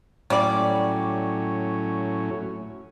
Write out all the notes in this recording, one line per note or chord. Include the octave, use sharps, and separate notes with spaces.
A2 F#3 G3 C#4 D5